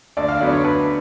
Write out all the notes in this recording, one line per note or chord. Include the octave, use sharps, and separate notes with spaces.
D2 D5
F5
D3 F#3 B3 D5
C#5
D2 B4